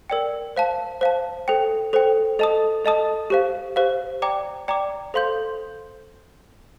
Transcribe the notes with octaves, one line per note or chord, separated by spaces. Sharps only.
A#4 D5 G5
C5 F5 A5
C5 F5 A5
A4 C5 G5
A4 C5 G5
A4 D#5 A5 D#6
A4 D#5 A5 D#6
G4 C5 F5
G4 C5 F5
D5 G5 A#5 D6
D5 G5 A#5 D6
A4 C5 F5 C6 G6